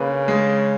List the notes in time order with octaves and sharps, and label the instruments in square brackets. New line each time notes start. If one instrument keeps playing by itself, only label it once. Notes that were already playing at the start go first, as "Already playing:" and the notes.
Already playing: [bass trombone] C#3 [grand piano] A#3 B4
[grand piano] G#3